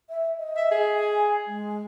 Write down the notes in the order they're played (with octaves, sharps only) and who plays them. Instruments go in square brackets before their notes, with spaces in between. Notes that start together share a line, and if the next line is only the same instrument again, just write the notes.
[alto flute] E5
D#5
[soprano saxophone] E5
G#4
[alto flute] G#5
G#3